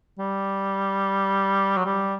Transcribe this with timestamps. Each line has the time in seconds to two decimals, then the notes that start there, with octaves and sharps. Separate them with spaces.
0.19 G3
1.77 F#3
1.85 G3